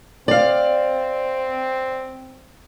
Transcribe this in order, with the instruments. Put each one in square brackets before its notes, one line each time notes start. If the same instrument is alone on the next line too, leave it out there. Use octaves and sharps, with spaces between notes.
[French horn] C4 [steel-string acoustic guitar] D5 F5